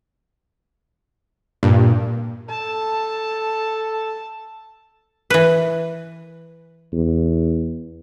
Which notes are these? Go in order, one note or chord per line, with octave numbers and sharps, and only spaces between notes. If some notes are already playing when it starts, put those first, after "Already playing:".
G2 A#2
A4 A5
E3 B4
E2